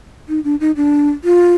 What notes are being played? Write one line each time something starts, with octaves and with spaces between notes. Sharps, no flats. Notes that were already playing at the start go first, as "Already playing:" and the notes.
D#4
D4
D#4
D4
F4